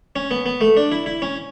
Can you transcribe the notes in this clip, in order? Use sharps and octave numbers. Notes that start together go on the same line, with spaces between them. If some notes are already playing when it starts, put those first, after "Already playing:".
C#4
B3
B3
A3
D4
E4
E4
C#4